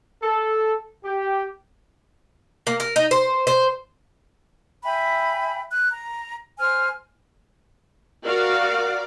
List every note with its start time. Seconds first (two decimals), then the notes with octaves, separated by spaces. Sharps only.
0.23 A4
1.05 G4
2.67 A#3
2.80 A#4
2.96 D#4
3.11 C5
3.47 C5
4.84 E5 G5 G#5 B5
5.72 F#6
5.92 A#5
6.58 C5 G#5 F6
8.25 F#4 A#4 D5 F5